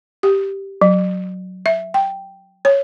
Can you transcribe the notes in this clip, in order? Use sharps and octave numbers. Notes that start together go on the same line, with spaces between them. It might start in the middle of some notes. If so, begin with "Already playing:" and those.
G4
F#3
E5
G5
C#5